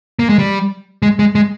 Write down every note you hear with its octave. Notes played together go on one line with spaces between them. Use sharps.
A#3
G#3
G3
G#3
G#3
G#3